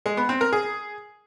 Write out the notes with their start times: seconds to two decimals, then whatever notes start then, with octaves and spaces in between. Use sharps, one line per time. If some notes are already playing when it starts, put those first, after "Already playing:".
0.06 G#3
0.17 B3
0.29 C4
0.41 A#4
0.53 G#4